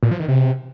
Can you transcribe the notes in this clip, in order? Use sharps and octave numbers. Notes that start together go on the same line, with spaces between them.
A#2
F3
D#3
C3